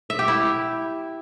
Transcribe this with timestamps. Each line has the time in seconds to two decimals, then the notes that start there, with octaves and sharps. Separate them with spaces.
0.10 E5
0.19 G4
0.28 E4